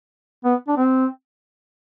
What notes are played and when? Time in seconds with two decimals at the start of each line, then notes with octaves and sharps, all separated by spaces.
0.45 B3
0.68 D4
0.77 C4